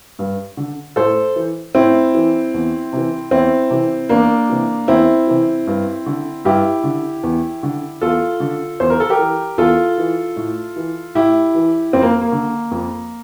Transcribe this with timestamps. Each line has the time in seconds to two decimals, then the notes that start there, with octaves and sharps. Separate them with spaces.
0.19 G2
0.57 D3
0.96 A2 A4 C5
1.36 E3
1.75 A2 C4 E4
2.14 E3
2.54 E2
2.93 C3 E3
3.31 E2 C4 E4
3.70 C3 E3
4.09 E2 A#3 D4
4.49 C3 E3
4.88 E2 C4 E4
5.27 C3 E3
5.67 G2
6.06 D3
6.45 G2 E4 G4
6.84 D3
7.23 E2
7.63 D3
8.01 E2 F4 A4
8.40 D3
8.80 E2 C5
8.90 A#4
9.00 A4
9.10 G4 A#4
9.19 E3
9.58 E2 F4 A4
9.98 E3
10.36 A2
10.76 E3
11.15 A2 E4 G4
11.54 E3
11.93 F2 C4
12.02 A#3
12.21 A#3
12.32 D3
12.71 F2